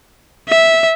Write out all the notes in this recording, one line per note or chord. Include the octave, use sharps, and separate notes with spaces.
E5